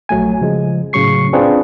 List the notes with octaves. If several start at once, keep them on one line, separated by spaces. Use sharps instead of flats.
A#1 F#3 A3 G#5
C#3 F3 G#3
A2 C#3 F#3 C#6 C7
C4 D4 F4 G#4 B4 C5